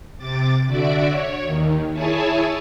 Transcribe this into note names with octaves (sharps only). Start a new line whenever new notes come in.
C3 D6 A6
D3 F#4 D5 E5 D6
C#5
D#2 D#3
E4 G#4 C#5 E5 G#5 A5